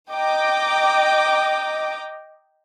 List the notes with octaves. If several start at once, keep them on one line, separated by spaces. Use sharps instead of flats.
D#5 G5 A#5 D6